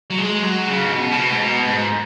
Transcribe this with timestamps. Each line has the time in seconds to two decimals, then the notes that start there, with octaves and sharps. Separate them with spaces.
0.10 F#3
0.18 G#3
0.43 F#3
0.67 C#3
0.83 G#2
0.92 B2
1.12 C#3
1.17 B2
1.31 G#2
1.42 B2
1.67 G#2